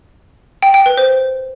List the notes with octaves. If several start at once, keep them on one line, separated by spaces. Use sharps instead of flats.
G5
G5
B4
C5